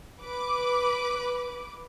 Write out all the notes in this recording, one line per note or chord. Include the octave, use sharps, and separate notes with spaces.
B4 D6